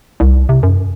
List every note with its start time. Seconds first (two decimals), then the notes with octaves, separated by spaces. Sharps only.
0.20 C2
0.49 C3
0.63 F#2